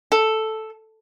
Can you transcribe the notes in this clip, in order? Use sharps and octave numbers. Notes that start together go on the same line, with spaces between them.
A4